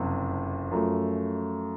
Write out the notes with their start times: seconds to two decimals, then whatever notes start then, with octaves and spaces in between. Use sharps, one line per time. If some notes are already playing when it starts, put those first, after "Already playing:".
Already playing: F#1 F2 C3
0.71 F#2 F3 A3